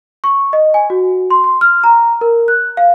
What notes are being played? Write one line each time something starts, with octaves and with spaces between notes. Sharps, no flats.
C#6
D#5
G#5
F#4
C6
C6
F6
A#5
A#4
F#6
F5